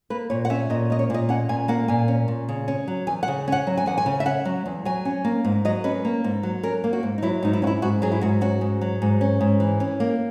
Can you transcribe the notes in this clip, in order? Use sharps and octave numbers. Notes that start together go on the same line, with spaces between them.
A#3 B4
A#2 C#5
F#5
C#4 E5
A#2 D#5
A#3 D#5
C#5
A#2 D#5
C#4 F#5
A#2 G#5
A#3 F#5
A#2 G#5
C#4
A#2
C#3
C#4
F#3
E2 G#5
F#5
C#3
C#4 F#5
F#3
G#5
E2 F#5
G#5
C#3
E5
C#4 F#5
F#3
E2
F#3 G#5
C#4
A#3
G#2
F#3 D#5
C#4 B4
A#3
G#2
F#3
C#4 A#4
A#3
F#4
G#2
D#4
F#3 E4
G#2 D#4
E4
C#4 E4 F#4
G#2 F#4
F#3 G#4
E4
G#2 F#4
C#4 F#4
G#2
F#3
G#2
C#4
G#2
E3
C#4
A#3